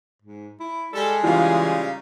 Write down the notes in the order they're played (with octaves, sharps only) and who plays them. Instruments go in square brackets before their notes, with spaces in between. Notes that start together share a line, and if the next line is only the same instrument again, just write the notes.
[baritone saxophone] G#2
E4
[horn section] G3 A4 [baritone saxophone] G#3
[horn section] C#3 G3 D#4 [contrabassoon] E3 [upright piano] F4 F5